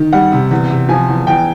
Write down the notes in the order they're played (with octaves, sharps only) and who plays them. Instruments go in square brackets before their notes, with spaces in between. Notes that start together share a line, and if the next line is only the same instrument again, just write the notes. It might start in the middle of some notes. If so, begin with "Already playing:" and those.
Already playing: [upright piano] D#3
[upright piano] G3 [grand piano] F#5
[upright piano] C3
E2
C3
[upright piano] F3 [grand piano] G#5
[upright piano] E2
[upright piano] E2 [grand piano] G5